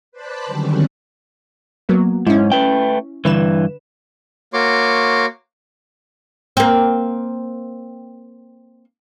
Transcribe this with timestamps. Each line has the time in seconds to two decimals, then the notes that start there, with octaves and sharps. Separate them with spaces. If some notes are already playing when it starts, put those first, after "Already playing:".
0.12 B4 C5 D5 A5 B5 F#6
0.46 D3 D#3 F#3 G3 C4 C#4
1.89 F#3 A#3 B3
2.27 G#2 C#4 E4
2.52 A3 B4 G5
3.25 G2 D3 E3 B4 E7
4.53 A#3 F#4 C#5 C6 D6
6.57 A#3 C4